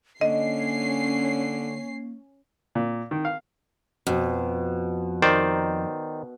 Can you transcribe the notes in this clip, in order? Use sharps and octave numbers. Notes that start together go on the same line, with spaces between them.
D3 A#3 C#4 D#5 C7
A#2
D#3
F5
F2 B2
D#3 C5 D5